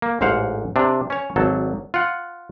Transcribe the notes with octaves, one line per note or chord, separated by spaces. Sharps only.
A#3
A1 G#2 C5 F5 F#5
C3 D4
C#4 C#5
G#1 F#3 A4
F4 F#5